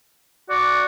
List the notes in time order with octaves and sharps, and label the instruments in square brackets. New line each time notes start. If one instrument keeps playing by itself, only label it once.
[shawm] F#4 [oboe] D5